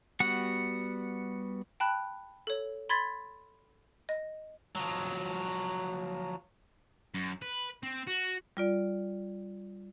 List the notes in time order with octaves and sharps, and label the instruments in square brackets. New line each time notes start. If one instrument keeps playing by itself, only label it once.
[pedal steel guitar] G3 B3 F#4 F#5
[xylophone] G5 A5 B5 F#6
A4 C#5
B5 C6 G#6 A6 B6
D#5
[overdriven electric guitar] F3 F#3
[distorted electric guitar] F#2
B4
C4
F#4
[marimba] G3 F4 D5